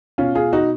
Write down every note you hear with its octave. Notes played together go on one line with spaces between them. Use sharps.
B2 C#4 F4
F4 G#4
D#4 F#4